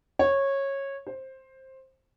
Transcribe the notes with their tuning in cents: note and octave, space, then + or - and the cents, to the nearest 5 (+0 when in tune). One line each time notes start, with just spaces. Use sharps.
C#5 -15
C5 +15